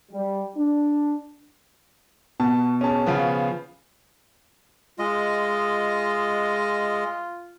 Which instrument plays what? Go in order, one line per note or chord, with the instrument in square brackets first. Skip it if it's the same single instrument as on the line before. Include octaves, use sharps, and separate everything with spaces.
[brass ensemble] G3
D4
[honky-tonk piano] B2 [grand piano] A5
[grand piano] C#4 G#4 A5
C#3 F3 B3
[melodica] G#3 D#5 [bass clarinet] F4